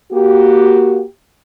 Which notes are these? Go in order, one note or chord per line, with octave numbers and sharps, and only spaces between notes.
A#3 F#4 G4